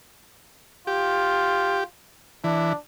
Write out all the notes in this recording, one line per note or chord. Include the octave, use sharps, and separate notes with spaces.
F4 G4
E3 D4